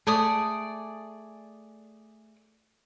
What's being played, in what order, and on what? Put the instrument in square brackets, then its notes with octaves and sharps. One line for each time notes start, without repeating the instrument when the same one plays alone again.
[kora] A3 [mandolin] G#4 D5 D#6